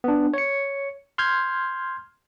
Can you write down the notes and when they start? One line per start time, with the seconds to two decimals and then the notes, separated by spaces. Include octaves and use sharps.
0.04 B3 D4
0.34 C#5 C#7
1.18 C6 F6 G6 G#6